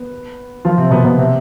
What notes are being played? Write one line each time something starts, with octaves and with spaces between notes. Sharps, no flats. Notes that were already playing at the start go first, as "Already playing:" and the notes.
Already playing: B3
F3 F4
C3 C4
B2 B3
B2 B3
C3 C4